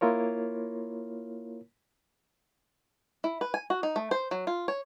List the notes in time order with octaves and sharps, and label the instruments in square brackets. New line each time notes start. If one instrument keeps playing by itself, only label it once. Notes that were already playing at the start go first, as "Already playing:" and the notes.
[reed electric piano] A#3 E4 F4 A#4 C#5
[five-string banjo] E4
B4
G#5
F#4
D#4
A3
C5
F#3
F4
C#5